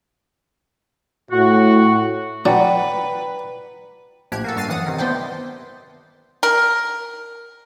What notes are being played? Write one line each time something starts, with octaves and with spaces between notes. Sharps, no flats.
A2 F#4
F#3 D4 B4 D5 F#5 G5 A#5
A#1 A2 F3 G4 F#6 G#6
A#3 F#4 A4
G2 F#4 F6 A6 C7 D#7
F#2 E3 F#5 D#6
C3 D#3
B3 E4 C5 D5 G5 A5
A#4